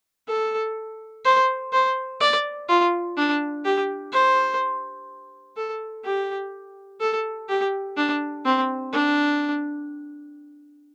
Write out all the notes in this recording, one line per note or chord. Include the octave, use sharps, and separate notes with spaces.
A4
C5
C5
D5
F4
D4
G4
C5
A4
G4
A4
G4
D4
C4
D4